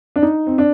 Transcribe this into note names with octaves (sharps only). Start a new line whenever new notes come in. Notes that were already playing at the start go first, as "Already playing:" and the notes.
D4
D#4
C4
D4